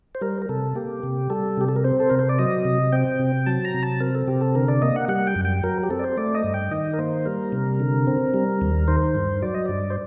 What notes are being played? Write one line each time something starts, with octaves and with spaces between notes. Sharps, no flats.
C5
G3 A#4
A#4
C3 A4
A#3 G4
C3
G3 A4
C3 G4
A4
A#4
C4 C5
A4
C3 A#4
C5
D5
F#3 D#5
C3
C4 G5
C3
F#3 A5
A#5
C3
A5
C4 A#4
A4
C3 G4
A4
D3 A#4
D5
A#3 D#5
F#5
G3 F#5
G5
F#2
G5
F#3 A#4
G4
C4 A4
D5
C5
A3 D5
D#5
G2
G5
D#3 D#5
A#4
A#3 C5
G3 A#4
C3
D3
C4
G3
D#2
D#3 C5
G2
F#3 D5
D#5
G2 D5
C5